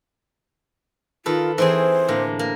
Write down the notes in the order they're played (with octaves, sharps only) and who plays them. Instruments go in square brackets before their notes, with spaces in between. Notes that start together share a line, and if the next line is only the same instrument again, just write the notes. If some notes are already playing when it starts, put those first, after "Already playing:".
[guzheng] D#3 A4 B4 [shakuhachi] F4
[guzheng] E3 C4 G#4 [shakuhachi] C5
[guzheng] A2 D3 A#3
A#3